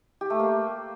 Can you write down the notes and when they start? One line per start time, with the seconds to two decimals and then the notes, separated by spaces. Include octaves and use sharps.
0.21 G4
0.30 A3
0.39 A#3